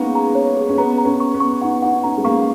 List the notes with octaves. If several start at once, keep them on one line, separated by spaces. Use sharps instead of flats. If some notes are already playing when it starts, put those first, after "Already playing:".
Already playing: G#3 A#3 B3 C#4 D#4 G#4 F#5
A#5
C#5
G#4
C#4
B3 A#5
A#5
C#4
C#6
B3
C#6
D#4 F#5
D#4 F#5
C#4 A#5
G#3
A#3 C#6